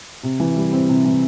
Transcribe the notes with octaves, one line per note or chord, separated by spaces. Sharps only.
C3
E3
G3
C4
C3
E3